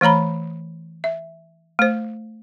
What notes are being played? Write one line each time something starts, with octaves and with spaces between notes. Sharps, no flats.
E3 A3 C#5 A#5 B5
E5
A3 C5